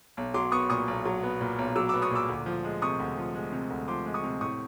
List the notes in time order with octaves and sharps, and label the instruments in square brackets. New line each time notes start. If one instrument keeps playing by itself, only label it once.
[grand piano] B1
F#3 C6 D6
B3 C#6 D#6
A#2 C#6 D#6
B1
F#3
B3
A#2
B1
F#3 D6 E6
D6 E6
B3
C#6 D#6
A#2 D6 E6
D2
F3
G#3
C3 C#6 D#6
D2
F3
G#3
C3
D2
F3 C6 D6
G#3
C#6 D#6
C3
A2 C#6 D#6